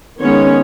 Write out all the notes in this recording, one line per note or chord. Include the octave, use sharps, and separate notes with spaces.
D#3 G#3 B3 C#4 C#5